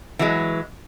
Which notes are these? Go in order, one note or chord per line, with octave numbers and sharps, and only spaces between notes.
E3 F#3 G#3